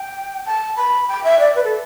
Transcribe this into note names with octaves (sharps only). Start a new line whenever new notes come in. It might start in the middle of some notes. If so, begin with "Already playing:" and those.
Already playing: G5
A5
B5
G5
E5
D5
B4
A4